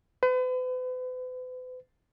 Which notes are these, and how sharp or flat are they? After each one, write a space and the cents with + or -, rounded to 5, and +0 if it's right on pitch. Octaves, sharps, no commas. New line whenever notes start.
B4 +45